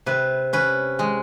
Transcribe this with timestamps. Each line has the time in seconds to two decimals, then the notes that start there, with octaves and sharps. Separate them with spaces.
0.06 C3 B4
0.53 C#4 B4
0.99 G#3